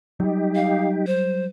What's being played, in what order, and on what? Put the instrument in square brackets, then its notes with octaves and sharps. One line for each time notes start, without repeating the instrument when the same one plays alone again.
[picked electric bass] F#3 G3 [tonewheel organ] D#4 G4
[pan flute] F5
C5